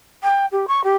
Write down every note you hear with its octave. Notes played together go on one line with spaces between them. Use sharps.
G5
G4
C#6
G4